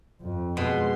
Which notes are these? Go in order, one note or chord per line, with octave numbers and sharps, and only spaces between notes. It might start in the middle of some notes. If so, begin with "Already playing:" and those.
F2
B2 G#3 C6